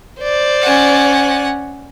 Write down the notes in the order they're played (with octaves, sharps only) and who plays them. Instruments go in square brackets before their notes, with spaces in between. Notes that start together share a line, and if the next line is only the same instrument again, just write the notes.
[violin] C5 D5
[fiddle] C#4 F#5